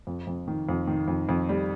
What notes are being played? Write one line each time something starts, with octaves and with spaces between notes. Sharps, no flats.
F2
F2
D#3
F2
D#3
F2
F2
G3